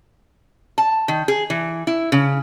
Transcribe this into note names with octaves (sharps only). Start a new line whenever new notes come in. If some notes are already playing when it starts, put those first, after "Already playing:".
A5
D#3
G#4
E3
E4
C#3